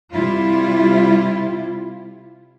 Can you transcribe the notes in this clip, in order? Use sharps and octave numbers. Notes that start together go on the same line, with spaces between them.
C3 G3 E4 F4